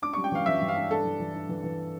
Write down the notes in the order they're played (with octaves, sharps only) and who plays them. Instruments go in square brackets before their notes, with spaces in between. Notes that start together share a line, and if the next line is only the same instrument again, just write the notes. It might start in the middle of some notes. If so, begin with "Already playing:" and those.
[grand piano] D4 [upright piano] D6
[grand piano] G3 [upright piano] C#6
[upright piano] G5
[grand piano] E3 [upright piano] F5
[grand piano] E3 [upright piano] E5
[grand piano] G2
[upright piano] F5
[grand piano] D4
[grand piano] D4 [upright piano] A4
[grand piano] E3
E3
D4
E3
E3